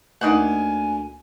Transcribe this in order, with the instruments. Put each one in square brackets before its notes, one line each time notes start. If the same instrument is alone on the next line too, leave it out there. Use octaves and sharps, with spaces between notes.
[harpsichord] D2 [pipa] A#3 D#4 F#5 [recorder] G#5